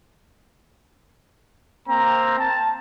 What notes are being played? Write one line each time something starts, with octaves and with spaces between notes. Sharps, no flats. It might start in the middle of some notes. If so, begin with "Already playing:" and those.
A#3 C4 A#5
A5